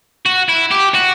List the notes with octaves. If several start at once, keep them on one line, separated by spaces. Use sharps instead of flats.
F#4
E4
G4
F#4